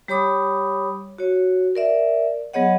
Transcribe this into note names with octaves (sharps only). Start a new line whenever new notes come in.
G3 G4 C#5 B5 D6 D#6
F#4 C#5
A#4 D5 E5
F#3 B3 G#4 C#5 D#5 F#5